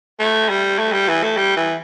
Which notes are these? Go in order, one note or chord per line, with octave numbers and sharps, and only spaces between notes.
A3
G3
A3
G3
E3
A3
G3
E3